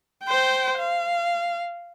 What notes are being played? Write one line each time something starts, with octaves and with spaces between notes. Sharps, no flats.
C5 G5
F5